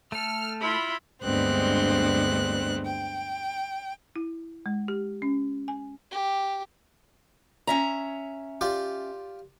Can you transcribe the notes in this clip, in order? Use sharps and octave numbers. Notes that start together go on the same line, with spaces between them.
A3 A4 F6
E4 F4 B5
D2 G2 G#3 B3 C4 F#6
G5
E4
G#3
G4
C#4
G#5
G4
C#4 E5 A#5
F4 G4 D5